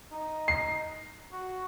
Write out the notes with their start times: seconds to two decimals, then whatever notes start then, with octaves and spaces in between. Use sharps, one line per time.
0.11 D#4
0.48 C7
1.32 F#4